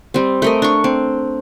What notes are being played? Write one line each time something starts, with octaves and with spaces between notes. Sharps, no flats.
G3 C4
A3 A#4 D#5
D4 C#6
C4